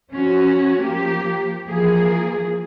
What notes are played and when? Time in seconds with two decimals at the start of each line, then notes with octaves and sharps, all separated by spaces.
0.11 F3 C#4 F#4
0.81 F3 A#3 G4
1.68 E3 F3 A#3 G#4